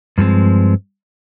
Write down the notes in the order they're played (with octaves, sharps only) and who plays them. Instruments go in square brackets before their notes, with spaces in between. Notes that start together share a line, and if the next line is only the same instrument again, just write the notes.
[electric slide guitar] G2 F3 G#3 C4